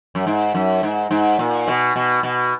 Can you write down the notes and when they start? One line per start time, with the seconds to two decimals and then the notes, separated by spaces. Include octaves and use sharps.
0.15 F#2
0.27 G#2
0.54 F#2
0.83 G#2
1.11 G#2
1.39 A#2
1.68 B2
1.96 B2
2.23 B2